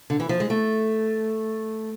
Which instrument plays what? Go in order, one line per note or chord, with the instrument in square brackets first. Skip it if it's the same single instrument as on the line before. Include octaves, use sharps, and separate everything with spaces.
[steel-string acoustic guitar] D3
E3
F3
G#3
A3